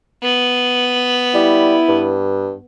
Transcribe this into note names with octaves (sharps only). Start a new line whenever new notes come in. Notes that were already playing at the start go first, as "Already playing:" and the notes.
B3
G3 E4
G2